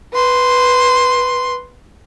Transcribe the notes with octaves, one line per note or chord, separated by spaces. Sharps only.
B4 C6